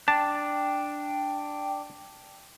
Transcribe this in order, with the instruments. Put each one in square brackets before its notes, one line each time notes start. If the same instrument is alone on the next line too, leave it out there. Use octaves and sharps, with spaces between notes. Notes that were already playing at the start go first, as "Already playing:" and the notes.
[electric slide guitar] D4 [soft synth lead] G5 [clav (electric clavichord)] A5